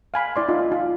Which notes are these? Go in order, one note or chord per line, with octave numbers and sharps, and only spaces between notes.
F5 G#5 B5
E4 D5 C6
D#4 F4
F4